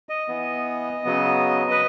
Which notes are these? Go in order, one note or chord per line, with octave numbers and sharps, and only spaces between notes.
D#5
E3 B3
C#3 F#3 B3
B4